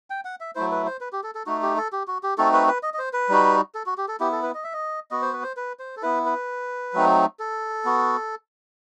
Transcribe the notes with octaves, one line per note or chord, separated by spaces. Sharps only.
G5
F#5
E5
F#3 A3 E4 C5
B4
C5
B4
G4
A4
A4
A3 D#4 F#4
G4
A4
G4
F#4
G4
A3 C4 D#4 F#4 A4
B4
B4
D#5
D#5
C5
B4
G3 D#4 F#4
A4
F#4
G4
A4
B3 E4 G4
A4
B4
D#5
E5
D#5
B3 F#4 D#5
C5
B4
C5
B4
C5
A4
B3 E4 B4
B4
F#3 A3 C4 D#4
A4
B3 F#4